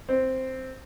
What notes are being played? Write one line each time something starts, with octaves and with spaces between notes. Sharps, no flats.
C4